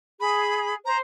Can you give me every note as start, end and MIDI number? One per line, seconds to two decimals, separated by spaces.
0.20 0.74 68
0.20 0.75 83
0.86 1.00 72
0.86 0.97 82